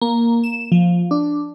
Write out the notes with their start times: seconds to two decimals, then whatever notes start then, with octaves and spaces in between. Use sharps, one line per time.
0.02 A#3
0.43 E7
0.72 F3
1.11 D4